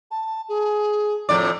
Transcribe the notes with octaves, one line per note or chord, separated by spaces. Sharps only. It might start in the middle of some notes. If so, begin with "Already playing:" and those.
A5
G#4
F2 A2 D5